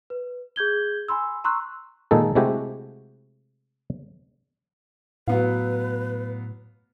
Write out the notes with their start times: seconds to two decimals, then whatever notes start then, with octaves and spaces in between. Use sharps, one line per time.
0.10 B4
0.56 G#4 G6 G#6 G7
1.08 G#5 B5 C6 E6
1.44 A#5 C6 C#6 E6 F#6
2.11 A#2 D#3 G#3 D#4 A4
2.35 C3 G#3 A3 E4 F#4 G4
5.28 A2 F#3 B3 B4 F5